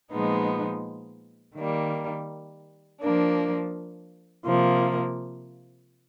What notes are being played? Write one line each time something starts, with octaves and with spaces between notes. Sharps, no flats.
A#2 F3 G#3 B3 D#4
D#3 G3 A#3
F3 A#3 D4
C3 F3 A#3